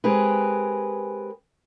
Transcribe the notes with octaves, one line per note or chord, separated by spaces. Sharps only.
G#3 C4 G4 G#4 A#4 B4